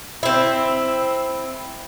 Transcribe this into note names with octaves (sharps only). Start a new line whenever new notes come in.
C4 E4